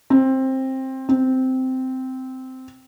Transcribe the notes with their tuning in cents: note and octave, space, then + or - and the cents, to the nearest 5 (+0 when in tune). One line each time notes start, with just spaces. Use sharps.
C4 +15
C4 -10